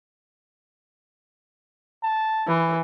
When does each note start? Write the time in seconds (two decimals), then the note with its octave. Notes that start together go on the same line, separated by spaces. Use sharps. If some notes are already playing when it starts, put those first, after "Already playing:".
2.03 A5
2.47 E3